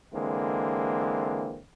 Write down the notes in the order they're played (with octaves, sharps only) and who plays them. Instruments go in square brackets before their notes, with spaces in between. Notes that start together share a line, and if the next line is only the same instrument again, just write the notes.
[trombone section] D3 E3 G#3 A#3 C4